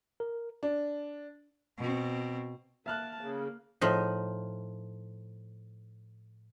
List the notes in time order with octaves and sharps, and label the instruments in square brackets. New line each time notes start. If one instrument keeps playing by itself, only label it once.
[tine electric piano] A#4
[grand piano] D4
[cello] B2 C4
[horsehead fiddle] A#3 A5 [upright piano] E5 F6 F#6
[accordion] C#3 [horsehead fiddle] A#3
[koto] A2 F3 D#4